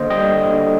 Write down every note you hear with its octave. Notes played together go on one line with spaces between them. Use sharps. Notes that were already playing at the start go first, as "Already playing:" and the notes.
Already playing: D3 A#3 C5 D#5
G3 D#5 G5
D3
D3